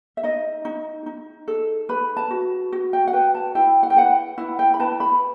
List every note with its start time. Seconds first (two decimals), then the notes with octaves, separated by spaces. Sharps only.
0.17 E5
0.23 D#4 D#5
0.65 D#4
1.06 D#4
1.48 A4
1.89 B4 B5
2.17 A5
2.31 F#4
2.73 F#4
2.93 G5
3.07 F#5
3.13 B4 G5
3.35 A5
3.55 E4 G5
3.83 F#5
3.90 G5
3.96 B4 F#5
4.38 E4 F#5
4.59 G5
4.74 B5
4.80 B4 A5
5.00 B5